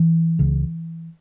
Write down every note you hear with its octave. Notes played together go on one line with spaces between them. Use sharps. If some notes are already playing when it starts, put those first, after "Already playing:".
Already playing: E3
C#2 C#3